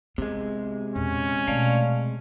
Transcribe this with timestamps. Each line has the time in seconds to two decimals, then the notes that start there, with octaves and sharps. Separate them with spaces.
0.18 C3 G#3 B3
0.96 E2 A#2 C#4
1.47 B2 A3 F4 D5 F5